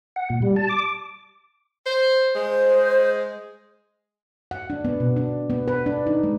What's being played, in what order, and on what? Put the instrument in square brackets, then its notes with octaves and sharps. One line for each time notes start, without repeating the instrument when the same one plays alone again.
[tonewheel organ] F#5
A#2
G3
A5
D6
[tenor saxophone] C5
[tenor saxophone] G#3 [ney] C5
[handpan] F#5
D4
B3
B2
D4
B3
B4
D4
D#4
G#3